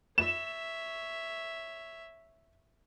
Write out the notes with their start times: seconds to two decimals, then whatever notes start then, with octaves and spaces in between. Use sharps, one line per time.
0.18 C#5 E5 E7